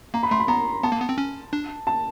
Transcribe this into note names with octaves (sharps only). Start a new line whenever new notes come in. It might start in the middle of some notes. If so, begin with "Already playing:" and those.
A#3 A#5
B5
A3 C6
B5
B3 A#5
B3 A5
A#3
B3
C4
C#4
D4
A5